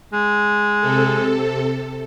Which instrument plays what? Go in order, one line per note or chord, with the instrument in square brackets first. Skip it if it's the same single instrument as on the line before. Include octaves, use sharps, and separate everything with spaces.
[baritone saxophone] G#3
[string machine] C3 A4